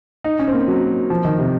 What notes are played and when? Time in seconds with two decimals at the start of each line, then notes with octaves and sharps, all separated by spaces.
0.24 D#4
0.39 C#4
0.48 C4
0.53 A#3
0.68 F#3
1.10 F3
1.25 D#3
1.39 C3